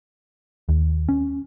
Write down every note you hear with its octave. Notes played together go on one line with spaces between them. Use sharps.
D#2
C#4